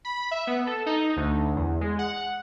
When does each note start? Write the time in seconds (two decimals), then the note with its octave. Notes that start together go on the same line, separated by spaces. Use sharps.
0.05 B5
0.31 E5
0.47 B3
0.67 A4
0.86 D#4
1.17 D2
1.56 E2
1.81 G#3
1.99 F#5